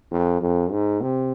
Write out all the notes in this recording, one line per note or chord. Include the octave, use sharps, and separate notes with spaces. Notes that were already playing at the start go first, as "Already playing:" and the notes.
F2
F2
G#2
C3